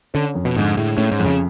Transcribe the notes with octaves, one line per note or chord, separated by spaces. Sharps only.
D3 C#4
F2
B2
G#2 D3
A2 G#3
A2 C#4
G#2
F2
C#3